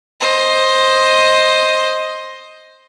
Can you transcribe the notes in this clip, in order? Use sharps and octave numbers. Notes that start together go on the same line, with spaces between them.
C5 D#5